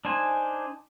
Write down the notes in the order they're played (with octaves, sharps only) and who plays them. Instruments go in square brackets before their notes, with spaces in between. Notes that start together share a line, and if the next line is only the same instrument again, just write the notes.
[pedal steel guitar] D4 D#4 C5 G#5